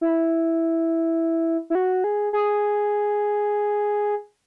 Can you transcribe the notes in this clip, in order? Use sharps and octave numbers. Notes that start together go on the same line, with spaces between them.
E4
E4
F#4
G#4
G#4